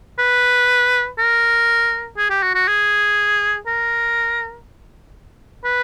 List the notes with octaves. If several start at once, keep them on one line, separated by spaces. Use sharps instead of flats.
B4
A#4
G#4
G4
F#4
F#4
G#4
A#4
B4